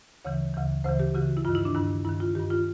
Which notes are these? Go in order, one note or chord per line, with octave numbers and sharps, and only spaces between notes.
D2 C#3 E3 C#5
D2 C#3 E3
D2 C#3 E3 C5
G4
D2 C#3 E3 F#4
E4
G2 D#3 F4
E4
D4
G2 D#3 E4
G2 D#3 E4
F4
G2 D#3 G4
F4